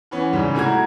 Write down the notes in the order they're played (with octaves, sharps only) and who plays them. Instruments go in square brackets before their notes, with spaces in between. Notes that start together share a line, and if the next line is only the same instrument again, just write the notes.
[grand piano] E3 B3 C#4
G#2 C#3 G3
C3 A3 E4 F#4 A#5 G#6